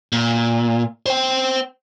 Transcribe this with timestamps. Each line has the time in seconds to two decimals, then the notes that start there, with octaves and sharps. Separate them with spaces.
0.13 A#2
1.06 C5 G5